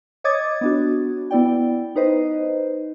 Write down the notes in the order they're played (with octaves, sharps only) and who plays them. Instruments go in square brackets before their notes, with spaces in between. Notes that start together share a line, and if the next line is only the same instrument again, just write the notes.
[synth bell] C#5 D#5 D6 D#6 G#6 A6
B3 D4 F#4
B3 E4 D5 G5
D#4 B4 C5 D#5